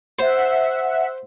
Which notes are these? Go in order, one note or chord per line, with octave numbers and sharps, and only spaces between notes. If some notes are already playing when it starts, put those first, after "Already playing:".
C5 E5 F#5